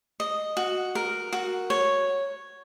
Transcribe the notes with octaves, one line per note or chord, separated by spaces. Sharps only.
D#5
F#4
A#4
F#4
C#5